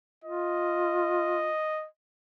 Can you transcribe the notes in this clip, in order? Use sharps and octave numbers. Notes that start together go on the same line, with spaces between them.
F4 D#5